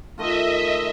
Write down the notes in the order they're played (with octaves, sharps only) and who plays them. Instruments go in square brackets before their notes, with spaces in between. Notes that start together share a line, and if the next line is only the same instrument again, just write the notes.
[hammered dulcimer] D#3 A3 F4 [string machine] D#5 E5